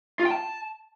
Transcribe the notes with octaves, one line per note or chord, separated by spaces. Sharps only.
F4
G5
A5